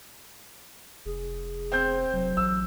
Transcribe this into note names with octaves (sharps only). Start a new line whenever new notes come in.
F1 G#4
C4 G6
F1 F#3
A1 E6